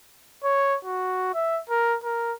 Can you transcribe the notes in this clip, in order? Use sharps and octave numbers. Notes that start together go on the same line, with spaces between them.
C#5
F#4
E5
A#4
A#4